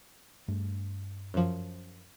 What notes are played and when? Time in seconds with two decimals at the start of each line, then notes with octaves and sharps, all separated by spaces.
0.48 G2 A3 D4
1.34 F#2 F3